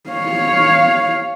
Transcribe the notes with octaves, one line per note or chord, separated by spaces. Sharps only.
C#5 F5